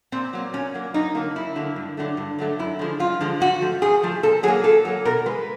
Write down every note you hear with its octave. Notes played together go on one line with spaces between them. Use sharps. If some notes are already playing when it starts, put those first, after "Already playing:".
A#2 C4
F#3 A#3
A#2 C#4
F#3 A#3
F#2 D#4
D3 F#3 A#3
F#2 E4
D3 F#3 A#3
G2
D3 F#3 A3
G2
D3 F#3 A3
F#2 E4
D3 F3 G#3
F#2 F4
D3 F3 G#3
G#2 F#4
F3 A3
G#2 G#4
F3 A3
A#2 A4
F#3 G#4
A#3
A#2 A4
F#3 A#3
B2 A#4
G#3 B4